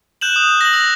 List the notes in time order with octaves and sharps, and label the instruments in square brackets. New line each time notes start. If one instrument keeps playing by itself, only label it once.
[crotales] F#6 G6 E7 F#7
D#6
A#6 F#7
E6